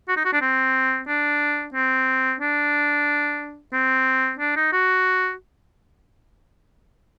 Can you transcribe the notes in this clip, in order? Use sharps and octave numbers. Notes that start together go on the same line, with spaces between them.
F#4
D#4
F#4
D4
C4
D4
C4
D4
C4
D4
D#4
F#4